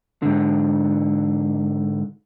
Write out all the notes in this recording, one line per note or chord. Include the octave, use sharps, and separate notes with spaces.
G#2 D3